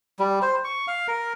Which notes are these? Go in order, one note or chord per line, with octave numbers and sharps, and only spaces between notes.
G3
C5
C#6
F5
A#4